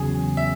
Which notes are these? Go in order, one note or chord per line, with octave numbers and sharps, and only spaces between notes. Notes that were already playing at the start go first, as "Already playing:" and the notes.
Already playing: E2 C#3 F#3 G#4
E5